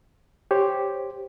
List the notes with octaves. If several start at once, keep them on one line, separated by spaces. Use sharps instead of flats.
G4 C5 C#5